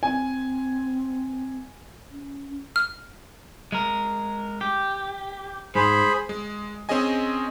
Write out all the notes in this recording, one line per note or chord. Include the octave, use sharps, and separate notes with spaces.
C4 G#5
C#4
F6
G#3 A#4
G4
G#2 G#4 C5 B5
G#3
C4 C#4 G#4 D#5 G#5